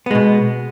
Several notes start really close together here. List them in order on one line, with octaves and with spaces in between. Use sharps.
B3 G#3 B2